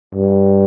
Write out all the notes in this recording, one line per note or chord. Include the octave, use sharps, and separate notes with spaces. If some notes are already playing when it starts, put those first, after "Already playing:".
G2